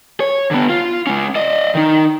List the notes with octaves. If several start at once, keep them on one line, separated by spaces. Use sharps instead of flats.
C#5
D3 B3
F4
G#3 C#4
D5 D#5
D#3 D#4